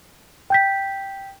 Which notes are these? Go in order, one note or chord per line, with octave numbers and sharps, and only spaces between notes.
G5 G6 B6